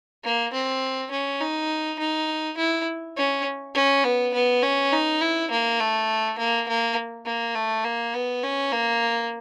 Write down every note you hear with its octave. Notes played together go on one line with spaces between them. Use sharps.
A#3
C4
C#4
D#4
D#4
E4
C#4
C#4
B3
B3
C#4
D#4
E4
A#3
A3
A#3
A#3
A#3
A3
A#3
B3
C#4
A#3